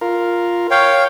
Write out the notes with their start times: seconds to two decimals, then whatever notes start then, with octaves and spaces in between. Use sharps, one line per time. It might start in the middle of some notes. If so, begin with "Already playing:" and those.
0.01 F4 A#4
0.71 C#5 F5 G5